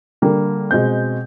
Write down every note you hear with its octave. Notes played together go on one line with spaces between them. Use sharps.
D3 G3 A#3
B2 G#3 C4 G6